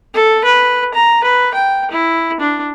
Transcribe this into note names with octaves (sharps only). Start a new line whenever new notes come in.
A4
B4
A#5
B4
G5
E4
D4